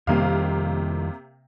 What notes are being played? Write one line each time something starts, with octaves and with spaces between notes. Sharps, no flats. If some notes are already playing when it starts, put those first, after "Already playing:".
F2 C3 D#3 G3 A#3 F5